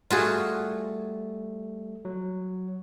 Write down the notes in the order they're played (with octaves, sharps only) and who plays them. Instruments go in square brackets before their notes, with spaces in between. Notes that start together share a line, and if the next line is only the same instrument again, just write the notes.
[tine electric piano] G3 A3 [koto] F4 F#4 G#4
[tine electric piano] F#3